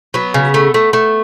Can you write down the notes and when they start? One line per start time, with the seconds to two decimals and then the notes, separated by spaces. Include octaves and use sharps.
0.14 F#3 B3
0.34 C#3
0.54 A3
0.74 A3
0.93 A3